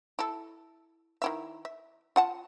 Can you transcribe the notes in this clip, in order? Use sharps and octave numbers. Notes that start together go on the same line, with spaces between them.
E4 A4
D#3 E4 E5
E5
F4 F#5 A5